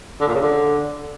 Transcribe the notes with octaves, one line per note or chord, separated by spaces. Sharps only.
D3
A#2
C#3
D3